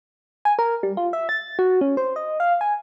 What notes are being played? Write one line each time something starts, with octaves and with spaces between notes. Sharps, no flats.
G#5
A#4
G3
F4
E5
A6
F#4
C#4
C5
D#5
F5
G#5